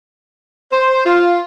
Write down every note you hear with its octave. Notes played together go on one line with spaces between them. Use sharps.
C5
F4